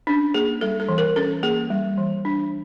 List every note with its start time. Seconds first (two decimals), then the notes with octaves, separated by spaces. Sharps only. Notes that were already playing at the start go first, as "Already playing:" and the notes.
0.07 C#4 D4
0.34 A#3 G#4
0.61 G3 A4
0.80 A4
0.89 E3
0.98 A#4
1.16 C#4 A4
1.43 A#3 G#4
1.70 G3
1.98 E3
2.25 D4